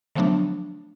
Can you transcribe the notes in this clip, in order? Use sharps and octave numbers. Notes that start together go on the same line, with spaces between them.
D3 F3 F#3 A3 B3 D4